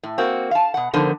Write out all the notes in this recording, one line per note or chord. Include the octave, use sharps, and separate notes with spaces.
A2
A#3 C4 F#4
F5 A5
B2 F#5
D3 F3 B3 D#4 A#4 C5